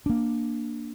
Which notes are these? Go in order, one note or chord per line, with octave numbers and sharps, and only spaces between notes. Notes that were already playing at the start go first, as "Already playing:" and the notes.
A#3 D4